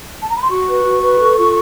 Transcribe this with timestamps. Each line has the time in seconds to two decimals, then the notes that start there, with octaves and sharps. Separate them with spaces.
0.22 A5
0.30 A#5
0.36 B5
0.43 C6
0.50 F#4 C#6
0.68 B4
0.84 F#4
1.02 B4
1.19 A4
1.36 F4